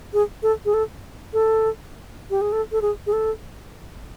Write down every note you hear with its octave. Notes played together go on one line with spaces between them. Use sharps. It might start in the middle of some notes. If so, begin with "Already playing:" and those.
G#4
A4
G#4
A4
A4
G4
G#4
A4
A4
G#4
G#4
A4